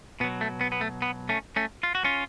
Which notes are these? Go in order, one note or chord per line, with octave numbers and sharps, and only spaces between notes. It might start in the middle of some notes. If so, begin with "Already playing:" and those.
B2 F#3 B3
A3
B3
B3
A3
B3
A3 C#4
A3 C#4
F4
F#4
C#4 F4